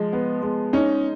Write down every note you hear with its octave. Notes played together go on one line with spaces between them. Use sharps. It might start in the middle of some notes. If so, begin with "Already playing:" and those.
Already playing: F3 G#3
B3
G#3
C#4 D#4